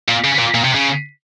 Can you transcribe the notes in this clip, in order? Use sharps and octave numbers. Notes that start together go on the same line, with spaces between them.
A#2
C#3
A#2
A#2
C3
C#3